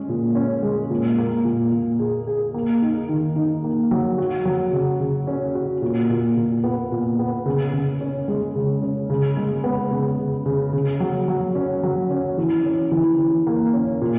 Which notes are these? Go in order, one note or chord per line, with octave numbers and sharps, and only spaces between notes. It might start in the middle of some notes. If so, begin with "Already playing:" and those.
Already playing: G#3 C#4
A#2
C#4
G#3
A#2
A#3
A#2
A#2
G#4
G#4
A#3
D#4
D#3
D#4
A#3
F#3
F#4
F#3
C#3
C#3
C#4
F#4
A#2
A#2
A#2
B3
A#2
B3
C#3
C#3
C#4
G#3
C#3
C#4
C#3
G#3
B3
C#3
C#3
C#3
C#3
F#3
F#3
C#4
F#3
C#4
E3
C#4
E3
E3
A#3
C#4
A#2